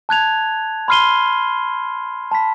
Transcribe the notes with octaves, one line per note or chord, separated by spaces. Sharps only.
A5 F#6 G#6 F7
B5 C6 F6 C7 D#7 G7
A5 B5 B6